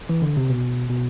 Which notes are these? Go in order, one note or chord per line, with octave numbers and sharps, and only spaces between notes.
E3
D3
C3
B2
B2